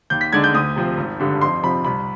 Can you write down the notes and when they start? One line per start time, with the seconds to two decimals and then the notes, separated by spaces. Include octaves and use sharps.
0.10 D#2 G6
0.21 B6
0.33 D3 G#3 D4 G#6
0.44 G6
0.54 D2 D#6
0.76 C3 F3 C4
0.97 G#1
1.20 G2 D3 G3
1.42 F2 C6
1.63 C3 F3 B5
1.85 C2 B5